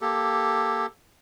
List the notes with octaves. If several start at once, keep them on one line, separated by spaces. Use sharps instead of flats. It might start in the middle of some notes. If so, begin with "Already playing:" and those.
A#3 G4 A4